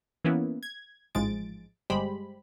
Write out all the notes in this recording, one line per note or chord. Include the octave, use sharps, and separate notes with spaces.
E3 A#3 B3 C#4 E4
G#6
A1 G#2 F3 G#3 A6 D7
G1 G3 G#3 G4 C5 B5